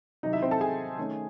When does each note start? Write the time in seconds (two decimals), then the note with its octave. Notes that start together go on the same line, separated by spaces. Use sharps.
0.23 C3 D#3 F#3 D#4 D#5
0.33 E4 E5
0.42 C4 C5
0.51 A4 A5
0.61 G#4 G#5
0.98 D#3 A3 C#4